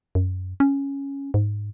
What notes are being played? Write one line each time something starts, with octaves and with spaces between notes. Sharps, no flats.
F#2
C#4
G#2